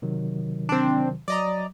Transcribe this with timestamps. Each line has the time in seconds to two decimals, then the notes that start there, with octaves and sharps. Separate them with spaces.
0.02 C3 D#3 F#3
0.69 C4 D4
1.28 F#3 D5 D#5 A#5